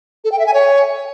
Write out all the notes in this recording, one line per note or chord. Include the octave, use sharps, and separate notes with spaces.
A4
G5
E5
G#5
C#5